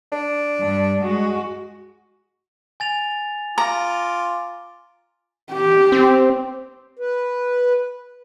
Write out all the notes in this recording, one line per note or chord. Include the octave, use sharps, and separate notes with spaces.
D4
G2
G#3 F#4
G#5 A6 F7
F4 A#5 D6
G4
C4
B4